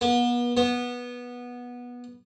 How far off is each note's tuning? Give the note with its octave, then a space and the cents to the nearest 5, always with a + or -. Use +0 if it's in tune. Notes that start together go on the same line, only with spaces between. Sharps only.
B3 -35
B3 -15